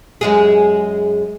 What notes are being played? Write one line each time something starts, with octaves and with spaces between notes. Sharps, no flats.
F#2 G#3 G#4